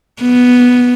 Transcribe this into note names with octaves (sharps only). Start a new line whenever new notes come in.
B3